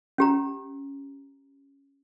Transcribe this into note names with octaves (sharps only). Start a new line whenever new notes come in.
C#4 G4 A#5